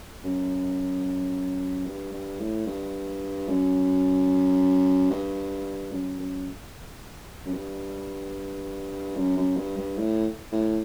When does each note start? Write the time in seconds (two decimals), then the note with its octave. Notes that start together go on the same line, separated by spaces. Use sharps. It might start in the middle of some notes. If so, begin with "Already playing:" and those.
0.24 F#2
1.86 G2
2.13 G2
2.40 A2
2.67 G2
3.49 F#2
5.11 G2
5.92 F#2
6.19 F#2
7.45 F#2
7.54 G2
9.16 F#2
9.37 F#2
9.57 G2
9.78 G2
9.98 A2
10.52 A2